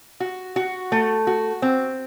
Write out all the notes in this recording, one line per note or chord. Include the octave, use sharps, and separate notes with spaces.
F#4
F#4
A3
F#4
C4